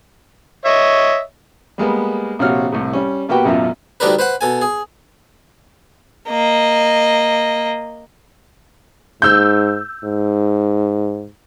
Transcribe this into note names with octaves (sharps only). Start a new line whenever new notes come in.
C#5 D#5 E5
G3 G#3 A#3 B3
A#1 C3 F#4 C#5 F6
C2 A2
G3 C#4
B2 A#3 F#4 G4 B4 G5
A1 F#2 B2 F4 E5
D2 D#3 G3 D4 A#4 B4
B4 C5 F#5
B2 A4 G#5
G#4
A#3 D#5
G#2 E6 G6
G#2